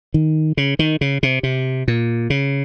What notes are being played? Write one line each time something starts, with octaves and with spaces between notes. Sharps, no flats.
D#3
C#3
D#3
C#3
C3
C3
A#2
C#3